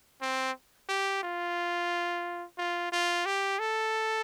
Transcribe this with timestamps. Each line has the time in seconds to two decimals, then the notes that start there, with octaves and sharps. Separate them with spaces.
0.21 C4
0.89 G4
1.23 F4
2.58 F4
2.92 F4
3.26 G4
3.59 A4